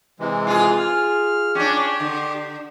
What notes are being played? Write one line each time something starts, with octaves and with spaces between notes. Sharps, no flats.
C3 E3 G#3
F4 G#4
F6
C#4 D4 G4
D3